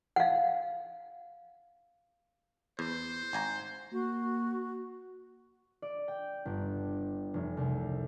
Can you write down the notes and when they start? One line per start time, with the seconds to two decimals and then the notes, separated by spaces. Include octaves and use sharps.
0.16 F5 F#5
2.79 E2 C5
3.33 G#1 G#5 A#5
3.92 A#3 F#4
5.82 D5
6.08 G5
6.46 G1
7.34 F1
7.57 C2